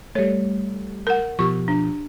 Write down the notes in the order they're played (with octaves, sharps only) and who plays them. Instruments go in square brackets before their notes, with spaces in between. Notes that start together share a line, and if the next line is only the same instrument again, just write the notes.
[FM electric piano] G3 A3 [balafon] C#5
[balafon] A#4 F#5
[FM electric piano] B2 F3 [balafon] G4 C#6
[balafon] D4